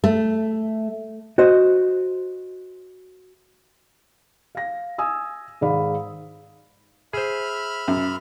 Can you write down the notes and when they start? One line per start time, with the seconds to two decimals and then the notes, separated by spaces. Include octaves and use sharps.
0.04 A3
1.38 F#4 C5 D#5
4.55 F5 A#6
4.98 G#5 D#6 E6
5.61 G#2 D#3 G#3 D5 F5 B5
7.13 G#4 C5 E5 B5 F6
7.88 F#2